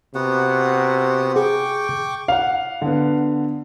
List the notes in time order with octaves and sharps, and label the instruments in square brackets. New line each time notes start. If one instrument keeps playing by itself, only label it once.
[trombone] C3 [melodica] B3 F#4 F#5
[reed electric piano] G#4 [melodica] G5 C#6 D6
[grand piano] F5 F#5
[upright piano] D3 B3